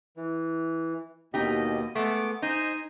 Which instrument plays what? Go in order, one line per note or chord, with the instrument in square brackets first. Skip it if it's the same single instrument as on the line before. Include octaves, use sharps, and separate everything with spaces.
[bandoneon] E3
[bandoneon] D#2 B2 D#5 [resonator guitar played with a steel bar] D#4 G4
[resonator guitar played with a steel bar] G#3 A3 [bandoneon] B3 D6
[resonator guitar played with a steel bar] D#4 [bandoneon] C5 D#5 G#5